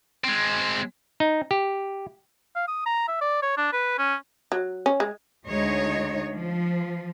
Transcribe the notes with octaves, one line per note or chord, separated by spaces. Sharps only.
G#3 C4
D#4
G4
F5
D#6
A#5
E5
D5
C#5
D4
B4
C#4
F#3
C#4
G#3
D2 G#3 D#4 C#5 D#5
F3